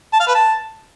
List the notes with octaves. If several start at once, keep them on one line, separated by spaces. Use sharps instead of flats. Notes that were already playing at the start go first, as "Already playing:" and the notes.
A5
F5
B4
A5